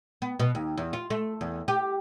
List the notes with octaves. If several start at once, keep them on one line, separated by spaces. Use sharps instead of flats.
B3
B2
D#2
E2
F4
A3
E2
G4